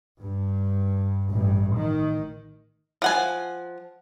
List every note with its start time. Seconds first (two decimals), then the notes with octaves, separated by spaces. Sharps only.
0.19 G2
1.29 A1 G2
1.74 D#3
3.02 F3 F#5 G#5